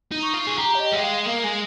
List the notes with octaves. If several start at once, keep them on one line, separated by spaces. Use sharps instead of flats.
D#4
C#6
F4
G#4
G4 A#5
C#5
D#5
G#3 G5
F5
A#3 F5
G#3 G#5